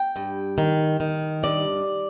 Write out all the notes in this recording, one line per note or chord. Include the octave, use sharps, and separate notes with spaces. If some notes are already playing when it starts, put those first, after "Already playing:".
Already playing: G5
G2
D#3
D#3
G2 D5